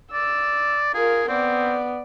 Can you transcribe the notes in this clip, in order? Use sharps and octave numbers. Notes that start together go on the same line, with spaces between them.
D5 E6
F4 G#4 A#4
B3 C4 D5